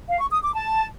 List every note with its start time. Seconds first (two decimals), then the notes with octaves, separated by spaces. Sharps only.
0.09 F5
0.20 C#6
0.31 D#6
0.42 D6
0.53 A5